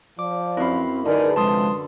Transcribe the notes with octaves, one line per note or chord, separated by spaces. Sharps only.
F3 D5 D6
F#2 C4 E4 F5 B5
D3 D#4 G#4 A#4 B4 D5
C3 F3 G#3 A4 A5 C6 D#6